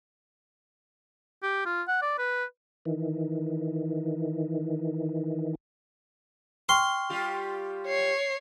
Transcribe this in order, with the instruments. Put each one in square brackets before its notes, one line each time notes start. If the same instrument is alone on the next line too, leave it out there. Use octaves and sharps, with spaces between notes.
[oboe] G4
F4
F#5
D5
B4
[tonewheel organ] D#3 E3
[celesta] G5 C#6 F6 [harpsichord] C6
[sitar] G3 F4 G4
[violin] C#5 C7